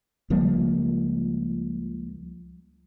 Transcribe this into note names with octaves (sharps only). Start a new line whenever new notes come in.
C#2 F3 G3 A#3